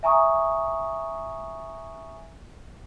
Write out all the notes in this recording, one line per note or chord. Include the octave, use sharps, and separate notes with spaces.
E5 G#5 A#5 C#6 D#6